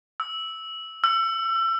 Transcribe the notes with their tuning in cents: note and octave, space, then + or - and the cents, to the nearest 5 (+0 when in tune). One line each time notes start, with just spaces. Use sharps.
E6 -10
E6 +30